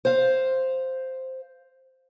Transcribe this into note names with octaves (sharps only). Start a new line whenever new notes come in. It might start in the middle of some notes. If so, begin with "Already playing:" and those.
C5 F5